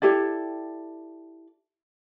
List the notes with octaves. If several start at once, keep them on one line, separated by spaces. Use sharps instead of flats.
E4 G4 A4 D5